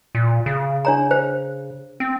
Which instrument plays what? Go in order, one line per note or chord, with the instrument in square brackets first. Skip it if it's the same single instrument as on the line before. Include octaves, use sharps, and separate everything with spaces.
[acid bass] A#2
C#3
[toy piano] D4 C#5 A#5
C5
[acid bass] C4